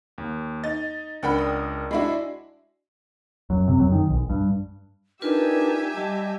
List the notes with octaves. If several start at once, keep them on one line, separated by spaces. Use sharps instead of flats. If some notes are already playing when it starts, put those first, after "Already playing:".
D#2
D#4 A6
C#2 D4 A#4 F#5 G5 B5
D#6
G#3 D4 E4 F#4 E5
F#2
C3
F#2
D#3
B1
G2
D4 D#4 F4 G4 A#4 B4 E5 G#5
G3 D#5 A5